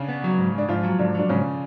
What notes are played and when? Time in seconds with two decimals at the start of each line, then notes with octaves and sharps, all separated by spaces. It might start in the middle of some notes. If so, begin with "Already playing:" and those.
Already playing: C#3 C#4 D4
0.09 B3
0.24 F#3
0.39 G#2
0.54 G#2 D4
0.69 G#2 F3 F4
0.84 F#3
0.99 G#2 D3 D4
1.15 F#3 D4
1.29 G#2 C#3 C#4